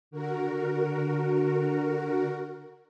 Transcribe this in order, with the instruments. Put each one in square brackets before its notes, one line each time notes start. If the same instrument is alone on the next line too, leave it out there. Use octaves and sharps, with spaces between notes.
[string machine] D3 F#4 A#4